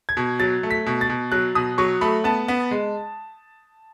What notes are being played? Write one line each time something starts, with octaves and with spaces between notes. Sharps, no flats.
G#6
B2
F#3 A6
A3
B6
B2
A6
B2
F#3 F#6
B2 D#6
F#3 C#6
A3 B5
B3 A5
B3
G#3